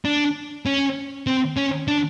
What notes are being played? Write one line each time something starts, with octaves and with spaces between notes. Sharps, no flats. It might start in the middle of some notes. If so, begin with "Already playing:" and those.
D4
C#4
C4
C#4
D4